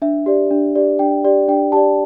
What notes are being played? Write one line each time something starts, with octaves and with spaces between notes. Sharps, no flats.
D4 E5
G4 D5
D4
G4 D5
D4 G5
G4 D5
D4 G5
G4 D5 A5